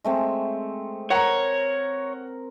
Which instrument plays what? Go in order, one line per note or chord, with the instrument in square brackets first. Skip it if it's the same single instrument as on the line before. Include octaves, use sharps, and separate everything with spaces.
[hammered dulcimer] G#3 A3 C4
[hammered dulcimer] A#4 [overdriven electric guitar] C#5 [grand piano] F#5 A#5